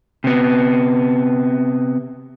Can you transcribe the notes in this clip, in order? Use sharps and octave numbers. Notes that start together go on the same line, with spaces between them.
C3 B3